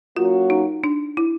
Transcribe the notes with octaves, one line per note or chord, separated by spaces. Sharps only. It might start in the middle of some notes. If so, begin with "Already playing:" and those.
F#3 A#3 C#4 F4 F#4
D#4
D4
E4